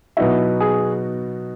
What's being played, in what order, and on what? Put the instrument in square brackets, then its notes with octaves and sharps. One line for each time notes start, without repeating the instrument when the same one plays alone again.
[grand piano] B2 F#3 B3 D#4 F#4 [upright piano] E4
[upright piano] G#4